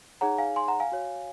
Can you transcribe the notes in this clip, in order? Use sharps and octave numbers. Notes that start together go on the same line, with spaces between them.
D#4 G#4 C#5 F#5 A#5
F5 G#5
G#5 C6
F#5 A#5
F5 G#5
F#4 C#5